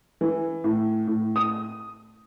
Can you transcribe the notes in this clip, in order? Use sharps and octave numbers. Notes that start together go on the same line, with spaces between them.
E3
A2
A2
D#6